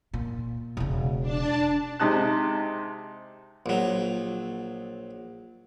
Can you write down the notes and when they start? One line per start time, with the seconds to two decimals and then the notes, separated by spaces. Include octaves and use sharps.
0.14 A#2
0.77 E1 C#3
1.20 D4 A5
2.00 C3 G#3 D#4 A5 F#6
3.66 A#1 F#3